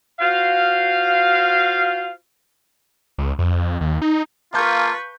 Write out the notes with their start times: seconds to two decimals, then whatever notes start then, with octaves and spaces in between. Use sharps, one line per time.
0.20 F4 F#4 C5 F5
3.18 C#2
3.39 F2
3.81 D#2
4.02 D#4
4.54 A#3 F4 B4 F5 A5 C#6 G6